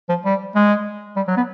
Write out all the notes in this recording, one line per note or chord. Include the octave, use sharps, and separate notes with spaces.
F3
G3
G#3
G3
F#3
B3